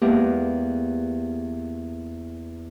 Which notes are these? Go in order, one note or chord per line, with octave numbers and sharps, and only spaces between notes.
E2 G#3 A#3 G4 A#4 B4